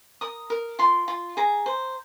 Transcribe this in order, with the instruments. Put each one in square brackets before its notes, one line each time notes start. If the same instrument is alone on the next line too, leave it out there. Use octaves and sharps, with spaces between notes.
[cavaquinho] A#4 D#6
A#4
F4 C6
F4
G#4 A#5
C5